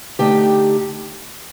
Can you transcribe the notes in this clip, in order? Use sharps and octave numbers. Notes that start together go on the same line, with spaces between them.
D3 A3 D#4 G4 G5